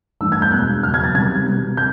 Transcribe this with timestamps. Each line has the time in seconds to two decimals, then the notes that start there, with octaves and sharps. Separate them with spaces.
0.21 G2 E3 A3 D4 E6
0.32 G#6
0.42 G6
0.52 E2 B2 G#3 F#6
0.83 E2 C#3 F#3 F6
0.94 G#6
1.04 A6
1.14 C3 D#3 G3 G#6
1.46 B2 G3 B3
1.77 C3 G6